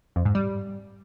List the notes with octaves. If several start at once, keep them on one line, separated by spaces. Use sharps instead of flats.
F2
G#2
G3